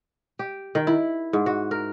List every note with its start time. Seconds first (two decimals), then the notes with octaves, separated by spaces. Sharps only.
0.39 G4
0.75 D#3
0.87 E4
1.33 G#2
1.46 F#4
1.71 A#4